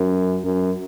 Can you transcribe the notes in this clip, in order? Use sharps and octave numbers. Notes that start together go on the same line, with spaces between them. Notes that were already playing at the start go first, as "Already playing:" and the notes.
Already playing: F#2
F#2